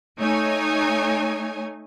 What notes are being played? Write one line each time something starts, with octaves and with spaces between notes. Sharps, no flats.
A3 D#4 C#5 G#5